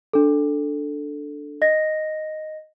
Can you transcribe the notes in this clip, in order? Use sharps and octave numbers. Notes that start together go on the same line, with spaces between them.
D4 A4
D#5 A#6